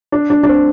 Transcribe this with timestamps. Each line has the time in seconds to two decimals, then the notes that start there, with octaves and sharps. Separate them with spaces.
0.12 D4
0.30 D4
0.43 D4
0.49 C4